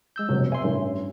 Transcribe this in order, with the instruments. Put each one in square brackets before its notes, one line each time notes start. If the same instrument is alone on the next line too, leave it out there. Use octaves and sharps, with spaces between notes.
[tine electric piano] G#3 E6 G6
[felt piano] F1 G2 B2 [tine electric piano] F#3
[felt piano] E5 [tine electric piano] G#5 C6
[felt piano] A1 [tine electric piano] G2